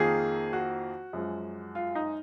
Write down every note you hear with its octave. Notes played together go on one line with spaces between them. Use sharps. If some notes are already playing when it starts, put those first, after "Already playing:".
Already playing: F2 D#3 A#3 G#4
F#4
F#2 F3 G#3
F4
D#4